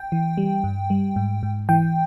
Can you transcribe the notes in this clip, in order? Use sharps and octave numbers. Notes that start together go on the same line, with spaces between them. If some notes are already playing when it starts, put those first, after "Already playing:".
Already playing: G5
E3
G3
G2
G3
G#2
G#2
E3 G5